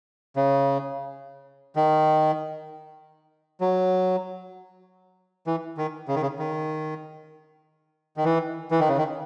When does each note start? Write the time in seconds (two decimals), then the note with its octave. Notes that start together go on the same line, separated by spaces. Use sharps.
0.36 C#3
1.76 D#3
3.61 F#3
5.47 E3
5.77 D#3
6.08 C#3
6.15 D#3
6.22 C#3
6.39 D#3
8.17 D#3
8.25 E3
8.71 E3
8.80 D#3
8.89 C#3
8.98 D#3